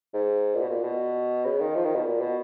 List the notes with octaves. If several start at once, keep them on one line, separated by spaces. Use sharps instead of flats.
G#2
A#2
B2
A#2
B2
C#3
D#3
F3
D#3
B2
A#2
B2